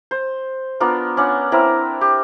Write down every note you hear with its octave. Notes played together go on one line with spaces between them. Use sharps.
C5
B3 D4 F4 A#4
C#4 D4 F#5
C4 E4 A#4
G4